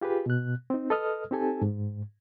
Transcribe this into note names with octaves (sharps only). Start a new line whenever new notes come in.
F4 G4 G#4 B4
B2 F#6
C4 D#4
A4 B4 D#5 D#6 F6
C4 D#4 G4 A4 G#5 A5
G#2